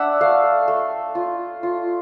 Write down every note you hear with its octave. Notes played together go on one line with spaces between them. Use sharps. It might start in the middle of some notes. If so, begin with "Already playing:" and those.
Already playing: D4 E5 F#5
A3 F5
A3
F4
F4